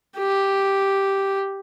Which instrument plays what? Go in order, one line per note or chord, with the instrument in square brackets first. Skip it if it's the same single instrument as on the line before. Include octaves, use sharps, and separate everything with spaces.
[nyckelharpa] G4